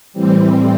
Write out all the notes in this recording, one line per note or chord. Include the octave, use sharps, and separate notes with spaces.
A2 E3 G3 C4